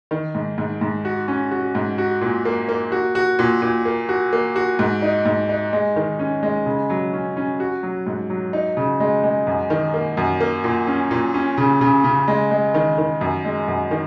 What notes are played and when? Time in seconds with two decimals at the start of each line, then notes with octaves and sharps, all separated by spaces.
0.11 D#3
0.35 G#2
0.58 G#2
0.81 G#2
1.05 F#4
1.28 C#4
1.51 F#4
1.75 G#2
1.98 F#4
2.21 A#2
2.45 A#3
2.69 A#3
2.92 F#4
3.15 F#4
3.39 A#2
3.62 A#2
3.85 A#3
4.09 F#4
4.33 A#3
4.56 F#4
4.79 G#2
5.02 D#4
5.26 G#2
5.49 D#4
5.73 G#3
5.96 D#3
6.19 C#4
6.43 G#3
6.66 C#3
6.90 F#3
7.13 C#4
7.37 C#4
7.60 F#4
7.83 F#3
8.06 G#2
8.30 F#3
8.53 D#4
8.77 C#3
9.00 G#3
9.24 G#3
9.47 F#2
9.70 D#3
9.94 A#3
10.17 F#2
10.40 A#3
10.64 A#2
10.87 C#4
11.11 A#2
11.34 C#4
11.58 C#3
11.81 C#3
12.04 C#3
12.28 G#3
12.51 G#3
12.74 D#3
12.98 D#3
13.21 F#2
13.45 G#3
13.68 F#2
13.91 D#3